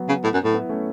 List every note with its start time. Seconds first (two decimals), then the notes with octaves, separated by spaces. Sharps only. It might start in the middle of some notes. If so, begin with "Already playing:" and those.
Already playing: F#3 B3
0.09 C#3
0.24 A2
0.34 F#2
0.44 A2
0.54 B3 E4
0.69 A3 C#4